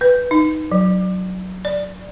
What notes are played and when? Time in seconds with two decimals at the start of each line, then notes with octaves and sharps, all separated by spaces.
0.01 B4
0.31 D#4
0.72 F#3
1.65 D5